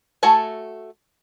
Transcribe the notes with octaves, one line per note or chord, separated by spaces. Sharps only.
A3 F#4 E5 G#5 A5